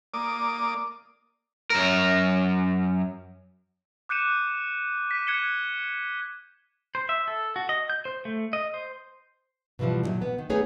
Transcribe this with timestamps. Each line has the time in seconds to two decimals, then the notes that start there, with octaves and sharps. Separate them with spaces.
0.14 A#3 D5 D6 D#6
1.70 F#2 A#4
4.09 D6 F#6 G6 C#7 D#7 E7
5.11 B6 D#7
5.27 F#6 G#6 C#7 E7 G7
6.95 C5
7.09 E5
7.28 A4
7.56 F#4
7.69 D#5
7.90 G6
8.05 C5
8.25 A3
8.53 D#5
8.74 C5
9.79 B2 D3 E3 F3 G3
10.03 A#2 D3 D#3 F#3
10.22 B3
10.38 D#3
10.50 A3 B3 D#4 G#4 C#5 G#5